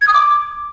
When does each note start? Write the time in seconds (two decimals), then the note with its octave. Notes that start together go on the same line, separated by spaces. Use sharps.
0.01 G#6
0.08 D#6
0.14 D6